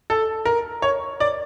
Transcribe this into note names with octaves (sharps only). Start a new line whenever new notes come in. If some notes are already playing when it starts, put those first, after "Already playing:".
A4
A#4
C#5
D5